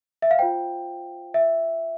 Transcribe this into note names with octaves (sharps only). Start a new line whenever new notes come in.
E5
F5
F4 C5 G5
E5